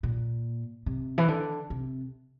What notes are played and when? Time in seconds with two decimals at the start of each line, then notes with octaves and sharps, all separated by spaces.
0.03 A#2
0.86 C3
1.18 E3
1.28 D3
1.70 C3